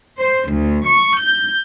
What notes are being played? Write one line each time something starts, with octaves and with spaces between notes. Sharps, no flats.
C5
D2
C#6
G6